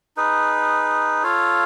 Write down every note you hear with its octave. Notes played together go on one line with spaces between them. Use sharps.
D#4 G#4 B4
F4 A4 C#5 F5